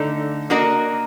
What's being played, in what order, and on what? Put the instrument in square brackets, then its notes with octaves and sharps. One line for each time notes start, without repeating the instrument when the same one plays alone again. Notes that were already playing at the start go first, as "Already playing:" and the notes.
Already playing: [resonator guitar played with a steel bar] D3 A3 D#4 A4
A#3 D4 F#4 A#4 D#5